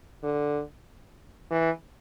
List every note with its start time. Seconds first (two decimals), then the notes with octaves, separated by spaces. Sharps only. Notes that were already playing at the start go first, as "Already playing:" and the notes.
0.23 D3
1.51 E3